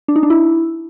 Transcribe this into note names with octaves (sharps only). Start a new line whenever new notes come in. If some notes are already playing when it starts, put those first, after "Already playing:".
D4
D#4
D4
E4